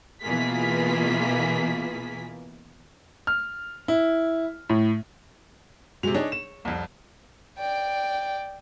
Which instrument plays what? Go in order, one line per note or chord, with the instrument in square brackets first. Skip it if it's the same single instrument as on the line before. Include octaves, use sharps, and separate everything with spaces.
[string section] B2 E3 A#3 F4 G#4 B6
[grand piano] F6
E4
A2
[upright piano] C3 F7 [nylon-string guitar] G#3 F#4
[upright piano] D4 D#4 G#4 [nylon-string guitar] C#5
[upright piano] E7
C2 F2
[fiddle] D5 G5